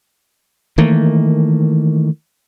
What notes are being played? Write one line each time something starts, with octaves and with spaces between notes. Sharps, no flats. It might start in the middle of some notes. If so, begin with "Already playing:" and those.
D#3 E3 A3 A#3